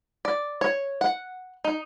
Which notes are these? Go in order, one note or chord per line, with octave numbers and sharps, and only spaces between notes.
D5
C#5
F#5
D#4